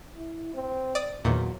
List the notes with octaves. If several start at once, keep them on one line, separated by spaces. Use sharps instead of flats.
E4
C4
D5 D#6
E2 A#2 D#3 F#3